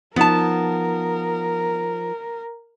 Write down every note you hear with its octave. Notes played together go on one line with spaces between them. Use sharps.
F3 B3 D#4 A#4 A5